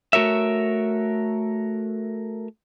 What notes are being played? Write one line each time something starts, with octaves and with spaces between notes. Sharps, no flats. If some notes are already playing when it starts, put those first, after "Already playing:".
A3 F#4 A#4 C#5 E5